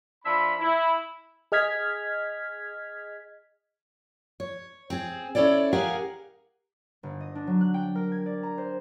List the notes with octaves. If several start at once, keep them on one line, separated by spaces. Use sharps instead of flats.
F3 D4 E5 B5
E4
G#4 D#5 F6 G#6 B6
C#5
C4 G#4
C#4 E4 A4 C#5 D5
G4 G#4 A#4 F5 F#5 G#5
G1
D#5
D4
F#3
F#6
G5
A#4
G#6
D5
A#5
C5